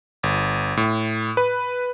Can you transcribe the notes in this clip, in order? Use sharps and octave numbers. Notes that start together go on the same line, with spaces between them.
G1
A2
B4